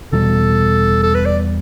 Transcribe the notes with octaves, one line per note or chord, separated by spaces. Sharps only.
E1 E2 B2 G3 A4
A4
B4
D5